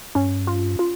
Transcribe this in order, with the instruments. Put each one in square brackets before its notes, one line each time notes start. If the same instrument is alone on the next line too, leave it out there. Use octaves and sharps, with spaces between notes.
[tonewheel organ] G2 [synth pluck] C#4
[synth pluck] F4
F4